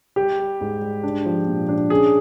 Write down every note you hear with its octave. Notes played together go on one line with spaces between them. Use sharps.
G3 G4
G3
G#2
G3
D4
F3
A#2
D4
C#4 G#4